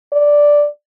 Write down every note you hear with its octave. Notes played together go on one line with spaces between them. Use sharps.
D5